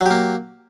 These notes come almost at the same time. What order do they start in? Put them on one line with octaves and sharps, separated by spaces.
F#3 G4 A#3